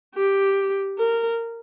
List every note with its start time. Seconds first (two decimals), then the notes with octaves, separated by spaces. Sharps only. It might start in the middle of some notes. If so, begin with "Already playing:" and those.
0.15 G4
0.98 A#4